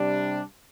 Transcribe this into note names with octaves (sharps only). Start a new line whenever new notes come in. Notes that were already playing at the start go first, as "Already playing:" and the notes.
Already playing: C3 G3 D4